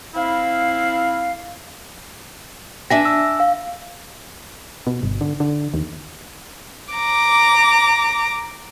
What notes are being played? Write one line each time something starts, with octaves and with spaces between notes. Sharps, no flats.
C4 E4 F5
D4 E5 G#5 A#6
E6
F5
B2
G1
D3
D3
D#2
A#5 D6